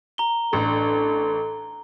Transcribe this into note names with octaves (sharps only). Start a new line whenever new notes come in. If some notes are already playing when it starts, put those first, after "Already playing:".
A#5 G7
A1 D4 A4